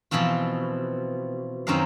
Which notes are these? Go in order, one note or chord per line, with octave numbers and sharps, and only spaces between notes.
B2 E3 F3 C4 F4
F#2 D#3 C4 C#4 A#4 F5